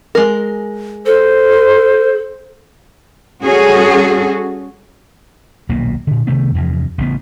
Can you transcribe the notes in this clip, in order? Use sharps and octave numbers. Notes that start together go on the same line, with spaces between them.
G#3 A#4
A4 C5
G3 C#4 F#4 G#4 A4
D#1 B1 B2 A#3
A#2 D3
C3 D#3 A3 B3
E2 G2 C3 F3
A1 C#3 B3